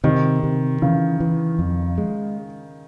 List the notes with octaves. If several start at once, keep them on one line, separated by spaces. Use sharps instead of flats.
C3 D#3
C3
C#3 E3
E3
F2
G#3